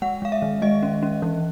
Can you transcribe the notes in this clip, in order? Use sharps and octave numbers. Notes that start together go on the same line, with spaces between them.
G#3 F#5
G#3 F5
E5
D#3
G#3 D#5
C#4
C#4
E3